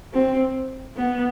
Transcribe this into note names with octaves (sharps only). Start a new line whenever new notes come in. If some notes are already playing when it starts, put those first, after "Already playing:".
C4
B3